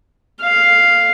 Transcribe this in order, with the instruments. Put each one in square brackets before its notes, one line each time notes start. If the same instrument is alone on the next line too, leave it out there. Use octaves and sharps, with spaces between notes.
[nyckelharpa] F5